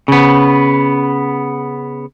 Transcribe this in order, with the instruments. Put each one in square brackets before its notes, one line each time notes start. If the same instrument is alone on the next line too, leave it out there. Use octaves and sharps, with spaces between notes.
[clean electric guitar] C#3 B3